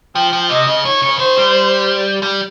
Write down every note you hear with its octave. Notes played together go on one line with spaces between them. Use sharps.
F3 G5
F3
C3 D#5
C#3
D#3 C#5
C#3
D#3 C5
G3
G3